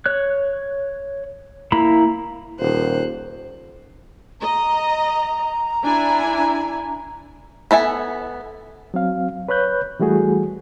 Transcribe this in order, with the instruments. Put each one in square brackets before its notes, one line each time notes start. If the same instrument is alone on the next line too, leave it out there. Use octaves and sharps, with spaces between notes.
[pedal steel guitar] C#5 F#6
A#3 E4 A#5 B5
[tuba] D#1 [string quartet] C5 F#6
[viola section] D#5 [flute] A#5
[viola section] D4 E4 G#5
[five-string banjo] B3 A4 E5 G#5
[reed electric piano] F#3 C4 F5
B4 C#5 B5 F#6 G6
E3 G3 A3 F#4 G#4